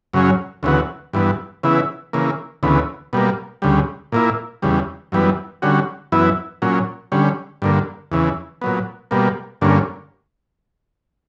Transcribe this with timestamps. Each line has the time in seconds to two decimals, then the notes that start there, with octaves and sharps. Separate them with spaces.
0.13 F#2 C#3 F#3 C#4
0.63 D2 C#3 E3 B3 F#4
1.13 G2 E3 B3
1.63 C#3 E3 B3 E4
2.13 C#3 E3 A#3
2.63 D2 C#3 E3 B3
3.13 B2 G3 A#3
3.62 D2 C#3 G3
4.12 A#2 A#3 E4
4.62 E2 C#3 G3
5.12 F#2 E3 G3 B3
5.62 D3 G3 C#4 F#4
6.12 F#2 E3 B3 E4
6.62 A#2 F#3 C#4
7.12 D3 G3 C#4
7.62 G2 D3 A#3
8.12 E2 C#3 E3
8.61 A#2 F#3 B3
9.11 B2 G3 A#3
9.61 G2 D3 A#3 C#4